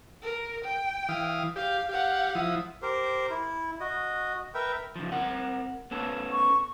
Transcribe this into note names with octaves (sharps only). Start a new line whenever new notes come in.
A#4
G5
E3 F5 D#6
G4 F5
G4 F5 F#5
F3 E4 D#6
G4 A#4 C5
E4
F#4 D#5
A#4 B4 E5 G5
C#3 F3
C4 A#4 F#5
B3 C#4 A4
C#6